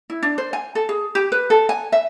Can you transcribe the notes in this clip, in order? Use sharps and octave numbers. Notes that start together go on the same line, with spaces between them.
E4
D4
C5
G#5
A4
G#4
G4
B4
A4
G#5
E5